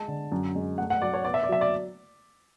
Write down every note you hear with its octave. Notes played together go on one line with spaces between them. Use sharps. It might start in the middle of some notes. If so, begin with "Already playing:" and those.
Already playing: G#3 A5
D3
F#2
G#3
A3 F#5
F#5
F#3 D5
C#5
B3 D5
E5
D5
F#3 E5
D5